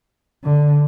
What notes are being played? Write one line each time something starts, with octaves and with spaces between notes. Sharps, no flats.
D3